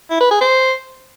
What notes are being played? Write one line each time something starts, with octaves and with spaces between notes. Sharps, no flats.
E4
B4
G#4
C5